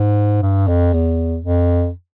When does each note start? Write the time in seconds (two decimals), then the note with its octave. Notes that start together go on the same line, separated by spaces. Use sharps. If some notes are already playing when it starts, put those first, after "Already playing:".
Already playing: G#2
0.42 G2
0.68 F2
0.93 E2
1.44 F2